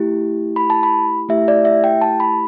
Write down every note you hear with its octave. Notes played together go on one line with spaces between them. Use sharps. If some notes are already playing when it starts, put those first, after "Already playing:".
Already playing: A3 E4 G4
B5
A5
B5
A3 E4 G4 E5
D5
E5
G5
A5
B5